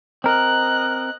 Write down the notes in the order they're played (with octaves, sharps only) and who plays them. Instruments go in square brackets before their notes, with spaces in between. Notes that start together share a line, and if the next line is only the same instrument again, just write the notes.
[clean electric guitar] C4 A#4 [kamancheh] D#5 F#6